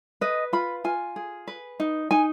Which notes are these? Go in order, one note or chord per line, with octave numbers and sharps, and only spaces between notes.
B4 D#5
F4 B5
F4 G#5
G#4
B4
D#4
D#4 G#5